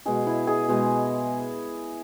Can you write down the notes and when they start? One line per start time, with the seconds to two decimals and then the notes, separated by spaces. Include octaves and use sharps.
0.06 B2 G#3 G#4
0.27 E4
0.47 G#4
0.69 B2 G#3